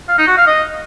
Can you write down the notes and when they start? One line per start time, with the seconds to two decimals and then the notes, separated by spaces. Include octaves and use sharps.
0.08 F5
0.18 D#4
0.28 F#4
0.37 F5
0.47 D#5